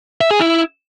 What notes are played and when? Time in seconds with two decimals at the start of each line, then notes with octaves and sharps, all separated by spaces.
0.21 E5
0.31 G#4
0.40 E4